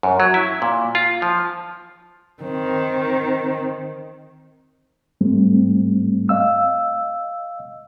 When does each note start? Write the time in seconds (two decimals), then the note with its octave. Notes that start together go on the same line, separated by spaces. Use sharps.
0.03 F#2
0.20 F#3
0.34 E4
0.62 A#2
0.95 F4
1.22 F3
2.43 D#3 C4
5.21 G#2 G3 A3 C4
6.29 D#5 F5 E6